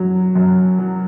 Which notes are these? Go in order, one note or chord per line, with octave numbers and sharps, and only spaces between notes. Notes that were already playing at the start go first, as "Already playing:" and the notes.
Already playing: F#2 F#3
F#2
F#3